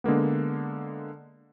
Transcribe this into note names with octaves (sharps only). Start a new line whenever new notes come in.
D3 G#3 A#3 B3